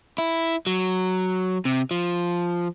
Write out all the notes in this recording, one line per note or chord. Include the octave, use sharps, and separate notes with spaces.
E4
F#3
C3
F3